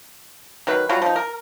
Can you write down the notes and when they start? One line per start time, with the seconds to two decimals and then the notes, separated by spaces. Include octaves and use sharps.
0.67 D#3 F#3 B4
0.89 F#3 G3 F4 F#4
1.02 F3 D#4
1.16 A#4